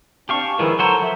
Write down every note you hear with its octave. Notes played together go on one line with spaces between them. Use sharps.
C4 D4 G4 F5 A5 C#6
G#5 A5
D#3 F3 G#3 E4 G#4 A#4 B4
F#3 F#4 A4 C5 A#5
F3 E5